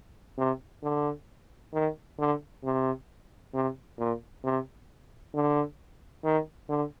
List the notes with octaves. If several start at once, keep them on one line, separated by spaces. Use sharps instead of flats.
C3
D3
D#3
D3
C3
C3
A#2
C3
D3
D#3
D3